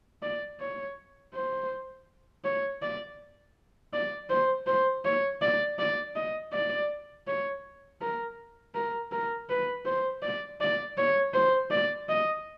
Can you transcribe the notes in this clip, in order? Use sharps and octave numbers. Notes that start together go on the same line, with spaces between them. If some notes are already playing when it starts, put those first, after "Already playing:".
D5
C#5
C5
C#5
D5
D5
C5
C5
C#5
D5
D5
D#5
D5
C#5
A#4
A#4
A#4
B4
C5
D5
D5
C#5
C5
D5
D#5